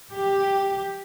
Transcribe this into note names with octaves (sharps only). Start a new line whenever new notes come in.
G4